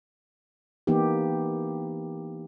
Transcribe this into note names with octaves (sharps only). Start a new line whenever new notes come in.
E3 A#3 B3 D#4 G4